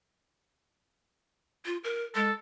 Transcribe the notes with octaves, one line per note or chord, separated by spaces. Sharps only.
F4
A#4
G#3 A4